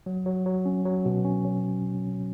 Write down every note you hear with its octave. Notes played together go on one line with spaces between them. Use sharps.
F#3
F#3
F#3
C#4
F#3
B2
C#4
F#3